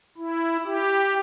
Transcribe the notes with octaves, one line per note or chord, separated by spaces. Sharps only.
E4
G4